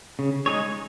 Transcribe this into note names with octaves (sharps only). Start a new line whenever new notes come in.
C#3
G#3 D#4 G#4 C#5